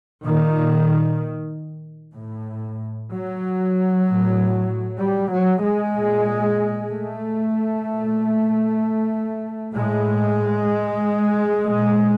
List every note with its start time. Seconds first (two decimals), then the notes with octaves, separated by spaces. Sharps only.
0.24 A#2 D#3
2.15 A2
3.10 F#3
4.05 A2
5.00 G3
5.32 F#3
5.64 G#3
5.95 A#2
6.90 A3
7.85 A#2
9.75 A2 G#3
11.65 A#2